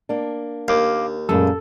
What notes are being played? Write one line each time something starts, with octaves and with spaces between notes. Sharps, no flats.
A#3 D4
D#2 F5 D6
F#2 A#2 C#3 G#3 A3 A4